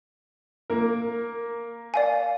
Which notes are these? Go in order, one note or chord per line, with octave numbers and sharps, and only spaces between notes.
A#3 A#4
D5 F5 G#5